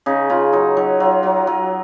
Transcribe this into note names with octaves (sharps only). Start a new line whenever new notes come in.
C#3 D#4
C#3 F4
F#3 D#4
F#3 D#4
F#3 F4
F#3
F#3